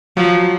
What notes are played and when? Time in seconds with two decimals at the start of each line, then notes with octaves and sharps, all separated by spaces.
0.17 F3 F#3